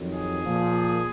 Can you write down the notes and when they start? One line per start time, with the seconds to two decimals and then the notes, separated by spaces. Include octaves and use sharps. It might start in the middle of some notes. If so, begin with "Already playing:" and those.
Already playing: F2 D#3 F#3
0.12 G#4
0.42 A#2 F3